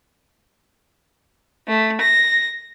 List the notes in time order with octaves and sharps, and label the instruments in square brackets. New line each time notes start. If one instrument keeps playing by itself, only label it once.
[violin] A3
A#6